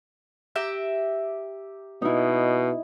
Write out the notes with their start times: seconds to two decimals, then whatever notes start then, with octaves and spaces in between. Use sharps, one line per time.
0.56 G4 E5 A#5
2.02 B2 D#4 E4